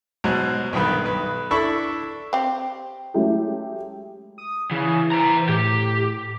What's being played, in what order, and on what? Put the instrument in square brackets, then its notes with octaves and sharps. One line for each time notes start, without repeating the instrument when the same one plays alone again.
[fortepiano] G#2 B2 F#3
B1 G2 D#3 B3 B4
B1 B4
D4 E4 A4 E5 B5 C#6
[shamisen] C4 G4
[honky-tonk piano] F#3 G#3 A3 C#4 E4 G4
[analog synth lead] D#6
[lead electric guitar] C#3 [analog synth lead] E3
[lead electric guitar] C5 A#5
[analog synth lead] A2 [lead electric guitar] G4